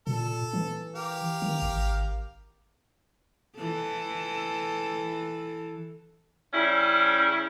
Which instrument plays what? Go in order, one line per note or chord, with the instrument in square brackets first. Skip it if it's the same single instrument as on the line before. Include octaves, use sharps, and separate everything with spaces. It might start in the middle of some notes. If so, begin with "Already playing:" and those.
[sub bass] A#2 [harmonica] A4
[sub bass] E3
[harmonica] G4 A#4 F5
[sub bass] D#3
G#1
[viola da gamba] E3 A4
[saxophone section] C#3 G3 C#4 E4